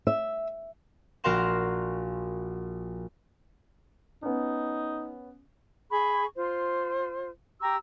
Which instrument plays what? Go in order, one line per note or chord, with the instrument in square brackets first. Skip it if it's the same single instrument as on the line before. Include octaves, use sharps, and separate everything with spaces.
[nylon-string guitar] E5
[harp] A#1 F#4 A#4 F5 C6 E7
[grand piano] B3 C#4 [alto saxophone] D#4
[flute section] G#4 B5 C#6
F4 C5
G4 A#5 C#6 E6